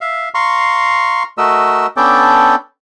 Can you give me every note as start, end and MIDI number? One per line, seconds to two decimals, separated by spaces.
0.01 0.29 76
0.01 0.29 77
0.35 1.23 77
0.35 1.23 82
0.35 1.23 84
0.35 1.23 85
1.38 1.87 57
1.38 1.87 66
1.38 1.87 70
1.38 1.87 75
1.38 1.87 88
1.97 2.55 59
1.97 2.55 61
1.97 2.55 62
1.97 2.55 69
1.97 2.55 74
1.97 2.55 79